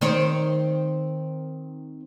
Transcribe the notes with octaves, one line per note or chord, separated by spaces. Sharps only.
D#3 C4 C#5